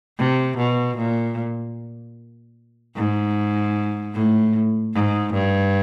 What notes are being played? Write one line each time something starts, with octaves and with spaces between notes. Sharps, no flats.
C3
B2
A#2
G#2
A2
G#2
G2